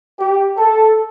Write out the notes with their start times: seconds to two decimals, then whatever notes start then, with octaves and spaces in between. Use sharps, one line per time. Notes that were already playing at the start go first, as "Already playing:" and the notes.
0.20 G4
0.58 A4